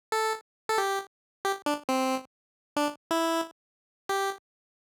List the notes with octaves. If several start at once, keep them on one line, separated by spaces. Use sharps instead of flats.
A4
A4
G4
G4
D4
C4
D4
E4
G4